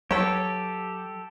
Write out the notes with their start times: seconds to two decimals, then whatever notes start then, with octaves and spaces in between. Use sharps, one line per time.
0.11 F#3 G4 A4 B4 C#5